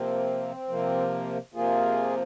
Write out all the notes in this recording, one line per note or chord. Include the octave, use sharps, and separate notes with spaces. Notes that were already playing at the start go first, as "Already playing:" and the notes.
Already playing: C3 F3 A#3 C4
C3 F3 A#3
C3 F3 A#3 F4 G#4